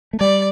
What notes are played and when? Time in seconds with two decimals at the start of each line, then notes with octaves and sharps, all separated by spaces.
0.13 A3
0.20 G3 D5